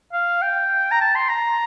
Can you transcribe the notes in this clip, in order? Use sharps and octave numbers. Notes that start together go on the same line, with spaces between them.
F5
G5
A#5
A5
C6
A#5